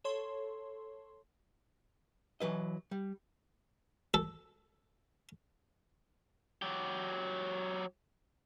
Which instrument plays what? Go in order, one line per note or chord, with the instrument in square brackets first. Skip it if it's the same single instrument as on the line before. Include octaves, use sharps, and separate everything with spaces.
[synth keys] A4 C#5 C6
[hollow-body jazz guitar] E3 F#3 B4 D#5
G3
[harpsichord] A4
[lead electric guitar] F#3 G4